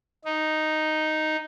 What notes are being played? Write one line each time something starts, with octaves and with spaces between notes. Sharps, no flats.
D#4